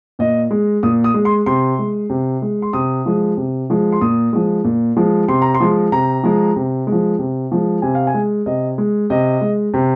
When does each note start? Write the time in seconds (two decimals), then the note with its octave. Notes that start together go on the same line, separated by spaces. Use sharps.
0.19 A#2 D#5
0.51 G#3
0.83 A#2 D#6
1.04 D#6
1.14 G#3
1.25 C6
1.46 C3 C6
1.79 G#3
2.10 C3
2.42 G#3
2.62 C6
2.73 C3 D#6
3.06 F3 G#3
3.37 C3
3.70 F3 G#3
3.92 C6
4.01 A#2 D#6
4.33 F3 G#3
4.64 A#2
4.97 F3 G#3
5.28 C3 C6
5.42 A#5
5.54 C6
5.60 F3 G#3
5.92 C3 A#5
6.23 F3 G#3
6.56 C3
6.87 G#3
6.92 F3
7.19 C3
7.51 F3 G#3
7.82 C3 G#5
7.95 F5
8.07 G#5
8.14 G#3
8.46 C3 D#5
8.78 G#3
9.10 C3 D#5
9.41 G#3
9.74 C3